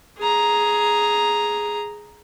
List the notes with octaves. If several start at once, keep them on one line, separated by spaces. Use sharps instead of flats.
G#4 A#5